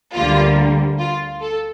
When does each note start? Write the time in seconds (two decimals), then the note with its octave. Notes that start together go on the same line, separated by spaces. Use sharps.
0.14 D2 D3 G3 A#3 F4
0.99 F4
1.41 A4